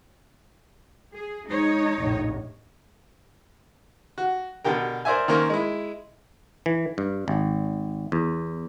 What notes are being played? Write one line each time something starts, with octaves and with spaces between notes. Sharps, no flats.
G#4
G#3 D#4 C#5
F1 A#1 A2
F#4
B2 D3 G4 A#4
A#4 C5 D5 E5 G#5
D#3 A#3 C#4 A#4 C5
G#3 E4
E3
G2
G#1
E2